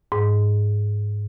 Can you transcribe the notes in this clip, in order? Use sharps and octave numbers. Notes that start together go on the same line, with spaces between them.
G#2